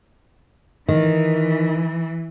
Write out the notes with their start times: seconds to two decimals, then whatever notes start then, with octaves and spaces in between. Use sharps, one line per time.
0.88 D#3 E3